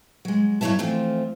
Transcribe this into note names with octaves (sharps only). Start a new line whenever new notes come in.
F#3 G#3
G2 F#3 E4 C#5 E5 A5
E3 F3 A3 C4 F4